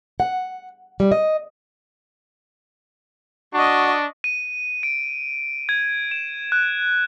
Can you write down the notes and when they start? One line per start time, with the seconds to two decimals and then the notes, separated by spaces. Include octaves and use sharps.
0.20 F#5
1.00 G3
1.12 D#5
3.54 D4 F#4 D#5 C#6
4.24 D#7
4.83 D7
5.69 G#6
6.11 E7
6.52 F#6